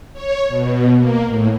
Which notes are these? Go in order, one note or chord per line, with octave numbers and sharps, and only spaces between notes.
C#5
B2
A#3
A2